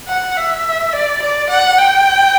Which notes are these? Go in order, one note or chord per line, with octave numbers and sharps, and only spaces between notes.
F#5
E5
D5
D5
F#5
G5